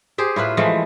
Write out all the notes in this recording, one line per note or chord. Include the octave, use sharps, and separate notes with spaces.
G4 G#4 C5
A2 E4 F4 B4
E3 F3 G#3 A3